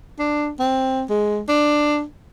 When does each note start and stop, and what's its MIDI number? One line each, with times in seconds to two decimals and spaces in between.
0.19 0.51 62
0.60 1.03 60
1.10 1.41 56
1.49 2.03 62